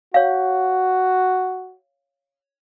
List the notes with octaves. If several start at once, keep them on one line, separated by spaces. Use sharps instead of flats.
F#4 C#5 F5